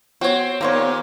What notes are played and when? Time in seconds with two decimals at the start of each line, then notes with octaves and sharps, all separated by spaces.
0.21 B3 C4 F#4 C#5
0.61 D#2 A#2 A#3 C4 C#5